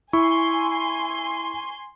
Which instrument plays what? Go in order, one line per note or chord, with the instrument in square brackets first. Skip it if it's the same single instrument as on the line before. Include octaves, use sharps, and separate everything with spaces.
[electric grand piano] E4 [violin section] G#5 C6 [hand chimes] C#6